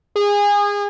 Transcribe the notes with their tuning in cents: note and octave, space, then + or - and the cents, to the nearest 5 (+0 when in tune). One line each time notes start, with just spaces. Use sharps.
G#4 -25